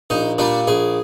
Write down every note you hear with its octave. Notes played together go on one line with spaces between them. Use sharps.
A#1 D#4
A#2 G3 D4
A#1 G#4